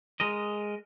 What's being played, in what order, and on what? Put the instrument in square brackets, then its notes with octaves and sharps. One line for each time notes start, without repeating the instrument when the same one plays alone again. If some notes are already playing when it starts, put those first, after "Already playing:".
[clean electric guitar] G#3 A#4 D#5